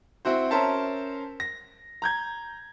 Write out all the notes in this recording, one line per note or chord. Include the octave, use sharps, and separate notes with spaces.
C4 E4 F#4 C5
C#4 A#4 C5 E5 A5
A#6
A#5 G6 G#6